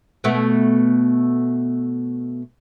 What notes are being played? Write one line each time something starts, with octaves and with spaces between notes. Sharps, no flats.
B2 A3 B3